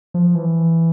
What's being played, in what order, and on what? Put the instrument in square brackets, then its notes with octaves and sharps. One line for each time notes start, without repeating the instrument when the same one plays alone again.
[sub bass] F3
E3